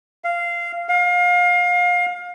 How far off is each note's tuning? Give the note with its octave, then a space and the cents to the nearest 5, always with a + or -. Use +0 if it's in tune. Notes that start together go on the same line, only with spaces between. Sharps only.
F5 -15
F5 +30